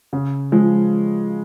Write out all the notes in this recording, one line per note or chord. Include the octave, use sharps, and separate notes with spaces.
C#3
F3 G#3